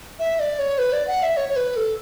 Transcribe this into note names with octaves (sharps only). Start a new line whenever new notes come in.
E5
D5
C#5
B4
D5
F#5
E5
C#5
C#5
B4
A4